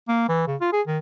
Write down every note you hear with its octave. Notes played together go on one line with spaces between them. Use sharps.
A#3
E3
C#3
F4
G#4
D#3